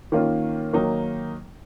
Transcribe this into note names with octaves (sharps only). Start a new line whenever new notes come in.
D#3 A#3 C#4 F4
D#3 F#3 A#3 D#4